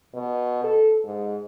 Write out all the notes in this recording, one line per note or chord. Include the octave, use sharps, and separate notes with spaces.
B2
A4
G#2